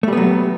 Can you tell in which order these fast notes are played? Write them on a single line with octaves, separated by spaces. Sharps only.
A3 G3 B3 F#3